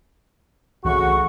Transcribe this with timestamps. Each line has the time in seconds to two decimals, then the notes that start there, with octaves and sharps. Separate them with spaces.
0.85 C2 C#3 E3 A3 F#4 F#5 C#6